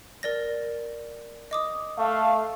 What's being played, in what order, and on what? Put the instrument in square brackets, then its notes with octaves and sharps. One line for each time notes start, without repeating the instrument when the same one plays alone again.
[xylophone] A#4 D5 A#6
D#5 D6 D#6
[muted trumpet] A3 [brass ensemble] F5